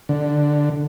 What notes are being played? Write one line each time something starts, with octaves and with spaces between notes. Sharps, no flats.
D3